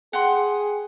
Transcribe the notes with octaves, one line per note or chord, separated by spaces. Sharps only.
G#4 F#5 G5 C6